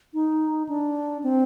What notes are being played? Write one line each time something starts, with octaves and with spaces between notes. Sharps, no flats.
D#4
D4
C4